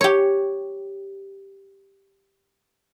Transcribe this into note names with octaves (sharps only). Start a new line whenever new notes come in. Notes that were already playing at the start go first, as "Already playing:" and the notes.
G4 C#5